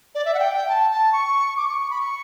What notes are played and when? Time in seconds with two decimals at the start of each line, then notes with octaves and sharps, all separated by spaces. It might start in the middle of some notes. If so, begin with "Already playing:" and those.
0.15 D5
0.25 E5
0.34 F#5
0.39 G5
0.54 G5
0.68 A5
0.91 A5
1.12 C#6
1.57 D6
1.69 C#6
1.79 C#6
1.90 B5
2.01 C#6